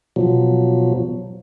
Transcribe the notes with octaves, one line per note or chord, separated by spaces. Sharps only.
B2 F3 F#3